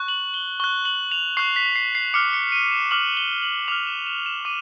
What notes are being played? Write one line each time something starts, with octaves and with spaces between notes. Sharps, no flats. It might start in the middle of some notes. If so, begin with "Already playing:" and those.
Already playing: C#6 F#6
F#7
G7
C#6 F#6 G7
F#7
F7
C#6 F#6 C7
B6
C7
C7
D6 F6 C#7
C#7
D#7
E7
D6 F6 F#7
G7
F#7
D6 F6 F7
E7
E7
E7
D6 D#7